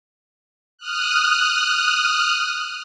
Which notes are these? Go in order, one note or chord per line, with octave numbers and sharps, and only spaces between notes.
D#6 F6 F#6